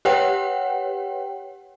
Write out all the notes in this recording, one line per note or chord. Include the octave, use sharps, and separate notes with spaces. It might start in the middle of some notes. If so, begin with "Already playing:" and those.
G4 B4 C#5 F#5 G5